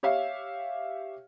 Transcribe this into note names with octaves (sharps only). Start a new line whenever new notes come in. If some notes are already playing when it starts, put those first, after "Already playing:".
G4 C#5 E5 F5